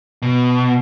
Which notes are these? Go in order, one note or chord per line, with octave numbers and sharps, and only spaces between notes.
B2